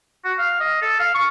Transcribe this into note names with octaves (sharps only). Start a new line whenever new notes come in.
F#4
F5
D#5
A4
F5
C#6